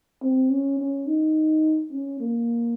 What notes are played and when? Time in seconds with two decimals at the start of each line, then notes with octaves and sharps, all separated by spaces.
0.22 C4
0.50 C#4
0.79 C#4
1.07 D#4
1.92 C#4
2.20 A#3